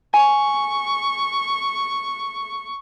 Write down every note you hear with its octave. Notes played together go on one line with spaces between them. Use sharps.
G#5 C#6